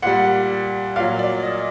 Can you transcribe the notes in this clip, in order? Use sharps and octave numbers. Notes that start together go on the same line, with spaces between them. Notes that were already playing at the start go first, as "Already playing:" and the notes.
A#2 G3 F#5
A#2 F#3 F5
D5
D#5